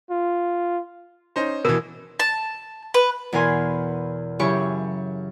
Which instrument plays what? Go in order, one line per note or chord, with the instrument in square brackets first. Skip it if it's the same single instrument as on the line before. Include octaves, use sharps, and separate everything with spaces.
[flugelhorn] F4
[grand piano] C#4 D#4 C5
[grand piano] B2 E3 [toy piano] A#4
[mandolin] A5
B4
[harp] E2 B2 A#4 G#5 C6
F#2 C#3 E4 G4 G5 C#6